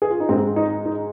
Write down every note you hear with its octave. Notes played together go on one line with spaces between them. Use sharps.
G#4
F4
D#4
G#2 G#3 C4
D#4
D#4